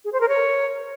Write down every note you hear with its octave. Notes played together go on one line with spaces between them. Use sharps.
G#4
C5
A#4
C#5